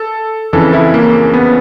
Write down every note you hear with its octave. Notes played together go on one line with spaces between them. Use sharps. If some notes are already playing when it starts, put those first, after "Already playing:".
Already playing: A4
F2 C#3 E3 A4
E4
A#3
B3